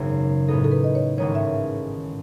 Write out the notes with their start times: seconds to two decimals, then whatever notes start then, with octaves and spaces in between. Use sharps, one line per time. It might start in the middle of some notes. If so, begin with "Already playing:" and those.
Already playing: G#1 F#2 C#3 B3
0.48 A2 G#3 B3 D#4 A4
0.64 A4
0.72 B4
0.84 D#5
0.95 C#5
1.18 A1 G#2 D#3 G#3 C#4 C#5
1.35 E5